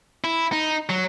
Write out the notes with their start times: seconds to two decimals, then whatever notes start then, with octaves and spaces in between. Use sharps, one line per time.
0.24 E4
0.53 D#4
0.89 F#3